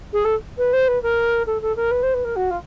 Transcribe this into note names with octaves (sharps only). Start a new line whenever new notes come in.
G#4
A4
B4
C5
B4
A#4
A4
A4
A#4
B4
C5
B4
A#4
F#4
F4